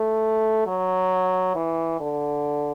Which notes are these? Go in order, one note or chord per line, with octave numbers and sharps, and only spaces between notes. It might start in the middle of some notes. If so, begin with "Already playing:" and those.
Already playing: A3
F#3
E3
D3